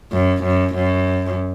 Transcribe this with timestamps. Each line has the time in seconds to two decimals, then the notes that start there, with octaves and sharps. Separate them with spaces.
0.12 F#2
0.44 F#2
0.75 F#2